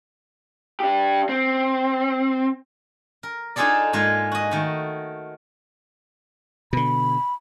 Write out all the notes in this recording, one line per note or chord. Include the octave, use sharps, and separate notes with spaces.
D4 G4
C4
A#4
D4 D#4 F4 G#4 A4 D5
G#2 G#3 A#3 F4
F#4 D#5
D#3 A3
B2 D3 B5